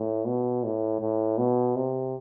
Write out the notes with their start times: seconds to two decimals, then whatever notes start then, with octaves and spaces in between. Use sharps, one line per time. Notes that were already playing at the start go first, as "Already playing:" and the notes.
Already playing: A2
0.27 B2
0.64 A2
1.01 A2
1.38 B2
1.76 C3